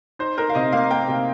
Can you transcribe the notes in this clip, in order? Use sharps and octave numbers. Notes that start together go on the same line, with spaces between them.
D#4 C5
D#4 A#4
F5
C3 D#5
A#3 F5
A#3 G5
C3